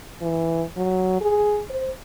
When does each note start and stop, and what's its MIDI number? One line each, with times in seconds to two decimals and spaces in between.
0.21 0.63 52
0.77 1.19 54
1.21 1.63 68
1.70 1.90 72